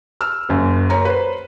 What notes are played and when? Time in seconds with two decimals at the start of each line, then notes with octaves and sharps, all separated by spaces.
0.21 E6 F6
0.49 F#1 F#2 A#3
0.90 A#4 C#5 A#5
1.05 B4 C5